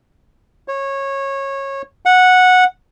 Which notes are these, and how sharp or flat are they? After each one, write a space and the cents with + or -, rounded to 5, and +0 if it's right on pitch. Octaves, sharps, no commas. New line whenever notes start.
C#5 -20
F#5 -10